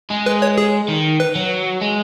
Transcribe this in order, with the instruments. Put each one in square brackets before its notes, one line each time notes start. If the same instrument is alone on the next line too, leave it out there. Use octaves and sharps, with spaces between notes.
[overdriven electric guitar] G#3
[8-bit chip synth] B4
C#5
G#4
[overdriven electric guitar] D#3
[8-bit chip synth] B4
[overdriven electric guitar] F#3
G#3